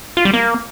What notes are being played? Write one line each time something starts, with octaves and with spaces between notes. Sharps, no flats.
F4
G3
A#3